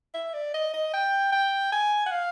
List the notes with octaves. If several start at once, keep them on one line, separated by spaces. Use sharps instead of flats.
E5
D5
D#5
D#5
G5
G5
G#5
F#5
F5